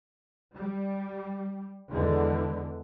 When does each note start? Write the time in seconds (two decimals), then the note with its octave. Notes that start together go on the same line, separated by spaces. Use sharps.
0.55 G3
1.90 E2 D3 G#3